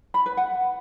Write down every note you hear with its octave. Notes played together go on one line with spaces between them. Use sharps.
B5
B4
F#5